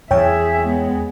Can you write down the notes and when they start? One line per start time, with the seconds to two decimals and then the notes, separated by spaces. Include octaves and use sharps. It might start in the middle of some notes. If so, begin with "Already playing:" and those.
0.11 E2 G#4 C#5 E5 G5
0.67 G#3 B3